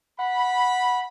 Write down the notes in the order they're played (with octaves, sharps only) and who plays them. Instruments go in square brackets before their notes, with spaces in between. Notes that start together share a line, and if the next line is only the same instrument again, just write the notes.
[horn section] F#5 B5